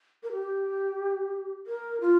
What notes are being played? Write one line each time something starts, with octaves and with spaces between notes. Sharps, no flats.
A#4
G4
A#4
F4